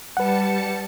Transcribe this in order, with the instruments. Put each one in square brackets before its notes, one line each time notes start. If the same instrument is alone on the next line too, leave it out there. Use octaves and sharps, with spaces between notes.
[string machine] G3 A5 C#7 [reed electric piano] B4 F#5